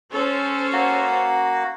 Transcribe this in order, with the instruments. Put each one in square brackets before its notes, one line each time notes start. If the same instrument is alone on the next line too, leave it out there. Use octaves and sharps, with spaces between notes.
[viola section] C#4 A4 C5
[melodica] A#3 F#4